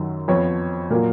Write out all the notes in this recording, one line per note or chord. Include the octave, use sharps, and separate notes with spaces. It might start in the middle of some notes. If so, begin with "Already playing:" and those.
Already playing: F#2 D#3 F#3
F2 F3 B3 C#5
A#2 F#3 A#3 A#4